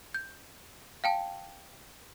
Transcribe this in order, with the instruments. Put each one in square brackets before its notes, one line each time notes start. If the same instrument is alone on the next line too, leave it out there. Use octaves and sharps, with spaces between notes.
[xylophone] G6
F5 G5 A5